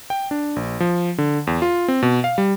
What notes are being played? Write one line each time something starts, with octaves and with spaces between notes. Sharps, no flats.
G5
D4
A#1
F3
D3
E2
F4
C4
B2
F5
G3